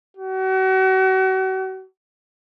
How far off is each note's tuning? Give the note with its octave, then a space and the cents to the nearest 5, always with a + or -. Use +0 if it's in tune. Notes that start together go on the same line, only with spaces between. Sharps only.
F#4 +35